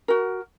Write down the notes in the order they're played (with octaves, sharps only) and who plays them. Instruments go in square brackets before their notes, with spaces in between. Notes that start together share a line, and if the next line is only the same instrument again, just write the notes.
[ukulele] F#4 A#4